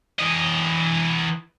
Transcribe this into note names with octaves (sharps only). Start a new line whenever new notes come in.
E3 D#5